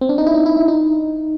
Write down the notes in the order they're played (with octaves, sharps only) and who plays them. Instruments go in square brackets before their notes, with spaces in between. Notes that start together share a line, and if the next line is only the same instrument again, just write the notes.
[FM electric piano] C4
D4
D#4
E4
D#4
E4
E4
D#4